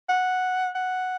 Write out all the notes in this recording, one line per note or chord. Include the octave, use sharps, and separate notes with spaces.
F#5
F#5